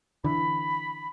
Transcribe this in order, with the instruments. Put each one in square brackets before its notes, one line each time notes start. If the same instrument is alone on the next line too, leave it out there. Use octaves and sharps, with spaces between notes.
[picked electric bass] D3 E3 [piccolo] B5